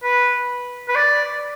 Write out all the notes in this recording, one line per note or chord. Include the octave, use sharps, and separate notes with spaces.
B4
B4
D5